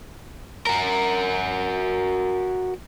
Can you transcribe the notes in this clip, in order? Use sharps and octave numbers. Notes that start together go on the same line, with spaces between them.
F#4 A#4